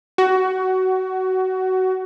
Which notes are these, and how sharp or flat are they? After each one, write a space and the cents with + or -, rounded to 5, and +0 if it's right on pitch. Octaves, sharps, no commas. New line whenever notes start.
F#4 +20